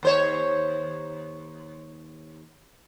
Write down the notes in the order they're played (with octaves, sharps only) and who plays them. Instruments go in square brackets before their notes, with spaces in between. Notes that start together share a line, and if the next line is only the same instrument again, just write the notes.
[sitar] D#2 C5 C#5